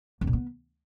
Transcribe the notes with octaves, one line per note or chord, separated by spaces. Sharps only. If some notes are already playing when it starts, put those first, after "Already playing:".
F2
A#2
B3